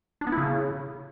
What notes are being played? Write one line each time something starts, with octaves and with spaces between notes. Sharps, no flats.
D4
B3
E4
C#3